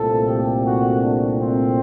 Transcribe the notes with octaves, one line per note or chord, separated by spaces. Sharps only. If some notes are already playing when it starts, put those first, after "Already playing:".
Already playing: C2 A#2 A3 C4 A4
G4
F#4
D4
C4